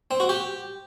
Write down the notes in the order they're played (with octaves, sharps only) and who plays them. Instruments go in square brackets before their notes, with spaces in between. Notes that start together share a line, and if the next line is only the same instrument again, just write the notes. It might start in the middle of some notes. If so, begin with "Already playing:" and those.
[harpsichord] C4
F#4
G4